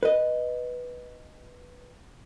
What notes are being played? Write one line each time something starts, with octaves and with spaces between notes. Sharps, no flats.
B4 D#5